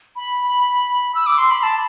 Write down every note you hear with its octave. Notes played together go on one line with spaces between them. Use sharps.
B5
E6
D6
C6
B5
A5